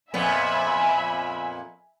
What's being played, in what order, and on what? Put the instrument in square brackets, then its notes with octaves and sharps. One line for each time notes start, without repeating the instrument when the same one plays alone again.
[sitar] F2 A#2 B3 [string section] E5 G#5 B5